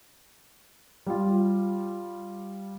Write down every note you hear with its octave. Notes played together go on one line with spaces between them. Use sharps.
G3 F4